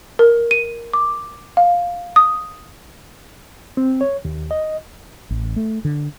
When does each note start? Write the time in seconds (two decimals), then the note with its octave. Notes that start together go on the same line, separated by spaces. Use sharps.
0.19 A#4
0.51 D#7
0.93 D6
1.57 F5
2.16 D#6
3.77 C4
4.01 C#5
4.25 D#2
4.51 D#5
5.31 A1
5.56 A3
5.85 D3